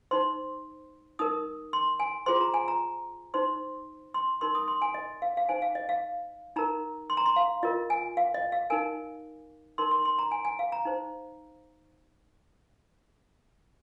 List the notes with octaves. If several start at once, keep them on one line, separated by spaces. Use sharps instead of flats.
D#4 C5 C6
D#4 A#4 D#6
C6
G#5
F4 G#4 C5 C6
A#5
G#5
A#5
D#4 C5 C6
C6
D#4 A#4 C6
D#6
C6
G#5
D#5
F5
F5
D#4 C5 G#5
F5
D#5
F5
D#4 A#4 A#5
C6
A#5
C6
F5
F4 A#4 D#5
G#5
F5
D#5
F5
D#4 A#4 G#5
D#4 A#4 C6
C6
C6
A#5
G#5
G#5
F5
A#5
D#4 C5